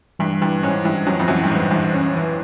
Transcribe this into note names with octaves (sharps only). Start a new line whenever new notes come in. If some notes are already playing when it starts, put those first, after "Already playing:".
G2 E3
G2 E3
G#2 C#4
G2 E3
F#2 C#4
F2
F#2 E3
G2
G#2 E3
G2 E3
C#4
E3